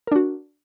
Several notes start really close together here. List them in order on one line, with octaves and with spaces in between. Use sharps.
A#4 D4 F#4